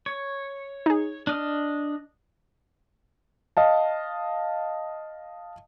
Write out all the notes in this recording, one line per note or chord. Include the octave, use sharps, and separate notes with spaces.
C#5
D#4 G#4
D4 D#5 F6
D#5 F5 A5